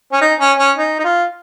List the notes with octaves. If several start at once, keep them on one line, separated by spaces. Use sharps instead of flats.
C#4
D#4
C#4
C#4
D#4
D#4
F4